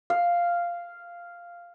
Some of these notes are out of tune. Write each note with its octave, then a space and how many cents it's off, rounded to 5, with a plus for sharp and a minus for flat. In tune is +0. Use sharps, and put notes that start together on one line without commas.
F5 -5